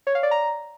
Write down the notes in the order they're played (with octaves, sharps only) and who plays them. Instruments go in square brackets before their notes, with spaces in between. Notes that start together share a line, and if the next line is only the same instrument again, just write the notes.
[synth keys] C#5
F5
D5
A#5